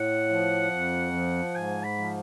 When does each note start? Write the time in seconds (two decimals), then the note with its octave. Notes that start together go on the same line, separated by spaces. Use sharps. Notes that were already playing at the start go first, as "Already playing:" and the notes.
Already playing: A2 F#5
0.29 F3
0.71 F2
1.13 F3
1.55 G#2 G#5
1.84 B5
1.98 F3